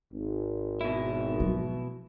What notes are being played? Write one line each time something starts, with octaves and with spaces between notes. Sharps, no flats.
G#1
B2 E4
F3 F#3